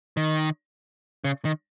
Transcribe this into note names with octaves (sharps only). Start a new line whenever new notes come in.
D#3
C#3
D#3